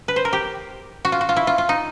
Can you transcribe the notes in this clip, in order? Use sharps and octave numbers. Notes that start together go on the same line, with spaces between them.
B4
C5
A#4
G4
F#4
F4
F#4
F4
E4
F4
F4
D#4